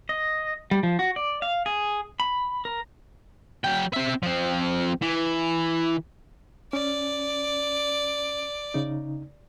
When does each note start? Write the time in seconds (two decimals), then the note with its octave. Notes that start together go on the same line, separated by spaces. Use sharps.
0.09 D#5
0.71 G3
0.83 F3
0.99 F#4
1.16 D5
1.42 F5
1.66 G#4
2.20 B5
2.65 A#4
3.64 F#3 G5
3.93 C4 E5
4.23 F3 C4
5.02 E3
6.73 C#4 D5
8.74 C#3 D#4